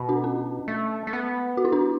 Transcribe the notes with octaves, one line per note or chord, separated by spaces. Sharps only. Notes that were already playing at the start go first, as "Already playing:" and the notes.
Already playing: B2
D4 F#4
C#4
A3
A3
B3
F#4
E4
D4 F#4